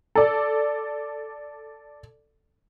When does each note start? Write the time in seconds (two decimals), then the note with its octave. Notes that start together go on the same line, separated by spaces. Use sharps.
0.15 A4 D5